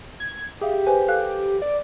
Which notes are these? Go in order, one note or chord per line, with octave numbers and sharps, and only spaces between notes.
G#6
G4 G#4 E5 F5
B4 C5 G#5
A4 F5 F#6
D5